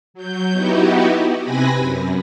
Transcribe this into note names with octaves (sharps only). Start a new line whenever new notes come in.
F#3 G6
B3 D#4 E4 F#4 G4
C3 C4 B4 G#5 B5 A#6
F#2